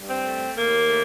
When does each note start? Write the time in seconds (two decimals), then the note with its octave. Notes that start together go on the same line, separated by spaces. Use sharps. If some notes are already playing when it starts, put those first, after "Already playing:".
Already playing: G2
0.08 C4
0.24 A3
0.55 D#2 A#3
0.87 A3